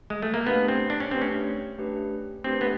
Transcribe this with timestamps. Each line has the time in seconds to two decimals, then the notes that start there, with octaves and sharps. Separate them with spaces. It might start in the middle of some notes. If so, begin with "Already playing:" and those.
0.10 G#3
0.22 A3
0.34 A#3
0.45 A3 B3 D4 G4 B4
0.68 C4
0.90 D4
1.00 C#4
1.11 A3 C4 D4 G4 B4
1.22 C#4
1.79 A3 D4 G4 B4
2.44 A3 C4 D4 G4 B4
2.61 B3